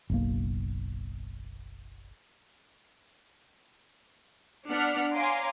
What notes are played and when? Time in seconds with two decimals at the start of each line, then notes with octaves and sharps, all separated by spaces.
0.10 F#1 B1 A#3
4.68 B3 D4 F#5 F6 B6
5.13 C#5 F5 G#5 A#5 C6 D6